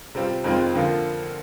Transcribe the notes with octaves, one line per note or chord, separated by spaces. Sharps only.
C3 G3 C4 F4
F2 D#3 G#3 C4 F4
D3 F3 A#3 F4